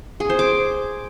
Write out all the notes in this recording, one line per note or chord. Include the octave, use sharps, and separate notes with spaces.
G#4
C5
D6